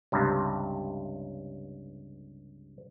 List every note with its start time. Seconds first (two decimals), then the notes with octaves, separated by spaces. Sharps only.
0.12 C#2 G2 C3